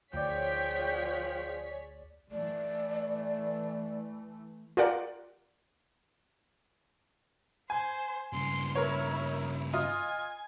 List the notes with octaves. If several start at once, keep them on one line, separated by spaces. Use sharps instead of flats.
D2 F3 G#4 C#5 D5 G5 B6
E3 A3 D5
F4 G4 A#4 D5 F#5
C5 G#5
G2 C#3 C6
E4 A#4 C#5
F4 D#5 G#5